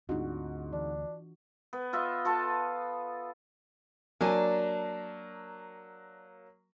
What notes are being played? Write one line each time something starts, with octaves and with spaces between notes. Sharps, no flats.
D2 G#2 C4 D4 F4 F#4
E3 D4
B3
F4 D#5 E5
F4 A4 B4 A5
F#3 A#3 D4 G#5